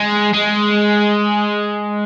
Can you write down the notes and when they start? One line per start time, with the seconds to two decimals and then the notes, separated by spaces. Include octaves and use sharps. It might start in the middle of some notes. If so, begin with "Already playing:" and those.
Already playing: G#3
0.34 G#3